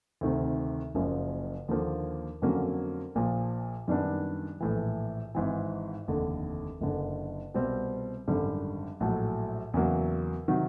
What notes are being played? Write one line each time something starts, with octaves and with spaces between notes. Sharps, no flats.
D2 C3 D#3
F#1 F#2 C#3 F3 A#3
D#2 D3 F3 A#3
F2 D3 F#3 A#3 C#4
A#1 A#2 F3
F#2 D#3 G3 B3 D4
A#1 A2 E3
G#1 G#2 E3
F1 D#2 D3
F#1 F#2 D3
C2 B2 G3 C4
G#1 F#2 D3 G3
A#1 A2 F#3 A3
E2 C#3 F#3 A#3
C3 D#3 F#3